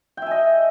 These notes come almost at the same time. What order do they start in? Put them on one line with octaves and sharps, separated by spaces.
G5 E5 G#5 D#5